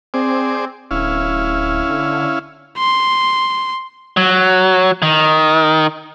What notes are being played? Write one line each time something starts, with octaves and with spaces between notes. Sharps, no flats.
C4 G#4 C5 D5
D1 C#4 E4 F5
D3
C6
F#3
D#3